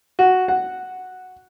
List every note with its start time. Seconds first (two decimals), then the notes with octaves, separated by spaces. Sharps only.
0.19 F#4
0.48 F#5